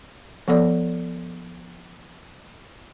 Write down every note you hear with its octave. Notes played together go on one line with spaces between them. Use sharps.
F3 B3 A4 D5